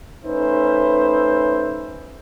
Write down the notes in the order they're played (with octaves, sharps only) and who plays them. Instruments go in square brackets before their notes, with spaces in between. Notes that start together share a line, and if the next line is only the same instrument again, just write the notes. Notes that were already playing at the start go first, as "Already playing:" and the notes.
[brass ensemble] A3 C#4 D#4 B4 C5 E5